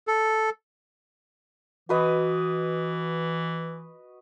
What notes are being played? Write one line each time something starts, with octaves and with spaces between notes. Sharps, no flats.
A4
E3 F#4 B4 D#5